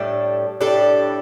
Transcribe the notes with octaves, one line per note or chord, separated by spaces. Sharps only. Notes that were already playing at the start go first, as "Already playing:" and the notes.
Already playing: A2 G3 D4 A4
A2 G3 D4 A4